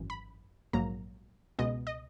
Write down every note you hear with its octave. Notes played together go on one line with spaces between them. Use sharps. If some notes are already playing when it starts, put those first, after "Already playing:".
Already playing: G#1 F#2 E3
B5
A#1 G#2 F#3 A#3 A#5
C#2 B2 G#3 B3 D#5
D#5